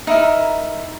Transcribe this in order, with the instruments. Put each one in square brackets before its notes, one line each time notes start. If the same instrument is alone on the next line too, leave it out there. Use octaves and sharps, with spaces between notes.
[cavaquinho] D#4 E4 A#4